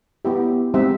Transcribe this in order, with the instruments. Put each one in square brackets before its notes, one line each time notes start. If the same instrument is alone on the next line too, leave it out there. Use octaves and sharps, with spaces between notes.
[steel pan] B3 E4 G4 E5
G#3 C4 D#4 G4 E5